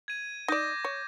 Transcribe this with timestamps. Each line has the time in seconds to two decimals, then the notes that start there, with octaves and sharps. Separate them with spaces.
0.08 G#6 D#7
0.48 D#4 D5 D6 G6 A#6
0.85 C#5